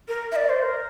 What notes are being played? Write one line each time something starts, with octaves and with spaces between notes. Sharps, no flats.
A#4
E5
D5
C5
A#4